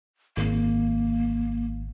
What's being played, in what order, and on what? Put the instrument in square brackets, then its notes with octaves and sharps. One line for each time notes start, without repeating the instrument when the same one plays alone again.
[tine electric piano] G#1 [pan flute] A#3